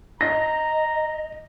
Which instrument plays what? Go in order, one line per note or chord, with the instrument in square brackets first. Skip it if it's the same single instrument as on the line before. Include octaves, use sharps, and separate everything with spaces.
[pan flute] D#5 [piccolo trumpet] A#5 [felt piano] A#6